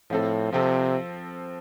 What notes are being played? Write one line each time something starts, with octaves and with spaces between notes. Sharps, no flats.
A2 F3 C4 A4
C3 F3 C4 A4